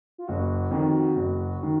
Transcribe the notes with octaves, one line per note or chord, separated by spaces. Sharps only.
F4
F#1 F#4
F2 D#3
F#1
D#3